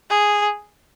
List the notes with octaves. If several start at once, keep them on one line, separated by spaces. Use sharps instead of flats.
G#4